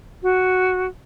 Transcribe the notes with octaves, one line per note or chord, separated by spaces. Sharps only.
F#4